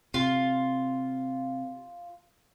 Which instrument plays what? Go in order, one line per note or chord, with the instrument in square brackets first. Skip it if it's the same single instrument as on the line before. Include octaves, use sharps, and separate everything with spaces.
[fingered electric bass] C3 [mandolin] F4